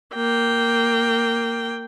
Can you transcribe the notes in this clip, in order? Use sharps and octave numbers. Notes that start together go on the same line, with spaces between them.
A#3 G5